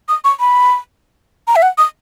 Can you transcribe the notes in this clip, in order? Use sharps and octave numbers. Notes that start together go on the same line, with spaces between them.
D#6
C#6
B5
A#5
E5
F#5
D#6